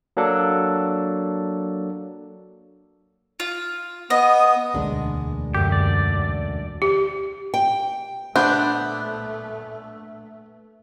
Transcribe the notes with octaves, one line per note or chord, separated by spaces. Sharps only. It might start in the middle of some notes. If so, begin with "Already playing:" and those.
F#3 A#3 D4 A4
F4
B3 D#5 D#6
E1 D2 G#3 A#3 D4
F#2 D3 G4
D5
G4
G5
A#2 A3 B3 D4 C5